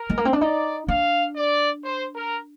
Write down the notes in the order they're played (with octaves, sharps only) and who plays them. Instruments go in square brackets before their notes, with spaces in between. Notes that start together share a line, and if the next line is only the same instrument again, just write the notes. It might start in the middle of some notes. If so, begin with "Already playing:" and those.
Already playing: [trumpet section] A#4
[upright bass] G#3
A#3
C4
D4
[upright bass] D#4 [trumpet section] D5
[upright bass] D4 [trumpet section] F5
[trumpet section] D5
C5
A#4